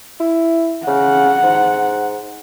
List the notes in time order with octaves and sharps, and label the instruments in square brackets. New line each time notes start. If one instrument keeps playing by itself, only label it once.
[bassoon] E4
[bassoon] C#3 [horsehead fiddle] F#5
[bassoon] G#2